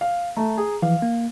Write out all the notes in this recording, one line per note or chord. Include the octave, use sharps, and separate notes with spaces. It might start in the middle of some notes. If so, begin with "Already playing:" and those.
F5
A3 A#5
G#4
E3 F3 F5
A#3